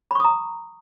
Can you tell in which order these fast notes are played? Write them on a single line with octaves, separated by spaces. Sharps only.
B5 C#6 D#6 A#5